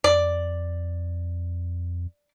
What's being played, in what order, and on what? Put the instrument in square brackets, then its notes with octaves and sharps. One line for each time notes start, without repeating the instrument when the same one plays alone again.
[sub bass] F2 [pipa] D5